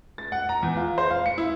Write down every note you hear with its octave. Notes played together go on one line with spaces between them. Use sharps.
A6
F#5
A#5
E2
F4
C5
F5
C#7
E4